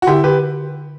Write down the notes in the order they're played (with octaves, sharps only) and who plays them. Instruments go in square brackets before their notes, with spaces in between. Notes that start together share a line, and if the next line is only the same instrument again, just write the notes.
[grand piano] F#4
[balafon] D3 [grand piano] E4 G4
[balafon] D3 [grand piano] G4 B4